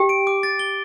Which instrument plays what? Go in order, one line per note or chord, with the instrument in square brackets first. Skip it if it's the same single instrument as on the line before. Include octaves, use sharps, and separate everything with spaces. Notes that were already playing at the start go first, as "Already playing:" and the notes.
Already playing: [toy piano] G4 G5
[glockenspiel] D7
D6
A6
G7